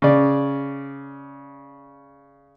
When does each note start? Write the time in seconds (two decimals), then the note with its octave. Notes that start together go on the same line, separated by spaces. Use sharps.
0.02 C#3 D5